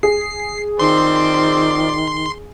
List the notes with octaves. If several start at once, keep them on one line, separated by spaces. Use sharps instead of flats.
G#4 C7
D#3 F3 C4 D5 C6